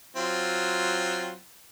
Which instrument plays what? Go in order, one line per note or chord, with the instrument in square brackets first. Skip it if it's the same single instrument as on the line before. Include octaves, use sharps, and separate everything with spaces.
[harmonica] F#3 C4 F4